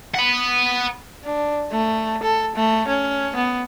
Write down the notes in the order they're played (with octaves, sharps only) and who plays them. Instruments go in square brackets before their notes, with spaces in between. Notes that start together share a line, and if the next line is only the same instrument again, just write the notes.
[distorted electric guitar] F#5 B5
[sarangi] D4
A3
A4
A3
C#4
B3